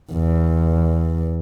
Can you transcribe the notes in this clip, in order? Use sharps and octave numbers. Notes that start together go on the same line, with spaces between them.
E2